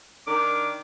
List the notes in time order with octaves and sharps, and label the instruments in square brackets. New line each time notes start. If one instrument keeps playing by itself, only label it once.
[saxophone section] D#3 D4 A#4 [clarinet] D6